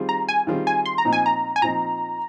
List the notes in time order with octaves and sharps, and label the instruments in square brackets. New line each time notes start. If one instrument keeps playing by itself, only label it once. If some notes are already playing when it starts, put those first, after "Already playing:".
Already playing: [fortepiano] D#3 G3 C4 F4 G#4
[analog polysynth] A#5
G#5
[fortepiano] D#3 G3 C4 F4 G#4
[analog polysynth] G#5
C6
A#5
[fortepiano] A#2 F3 C4 D#4
[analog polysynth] G#5
A#5
G#5
[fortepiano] A#2 F3 C4 D#4 [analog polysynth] A#5